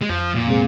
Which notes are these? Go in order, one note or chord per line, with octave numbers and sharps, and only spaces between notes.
G#3
F2 F3
A#2
C3 G#3 C4 G#4